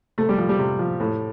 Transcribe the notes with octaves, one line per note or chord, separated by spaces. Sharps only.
C3 A3
G3
F3
G3
C3
F3
A2